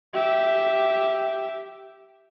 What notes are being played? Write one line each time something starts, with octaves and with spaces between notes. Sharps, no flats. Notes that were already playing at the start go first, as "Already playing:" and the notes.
G4 E5